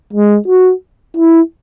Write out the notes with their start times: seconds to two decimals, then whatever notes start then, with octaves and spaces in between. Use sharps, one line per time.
0.13 G#3
0.48 F#4
1.17 E4